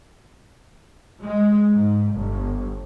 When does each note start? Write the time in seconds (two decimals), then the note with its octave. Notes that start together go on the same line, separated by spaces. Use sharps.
1.22 G#3
1.72 G#2
2.13 G1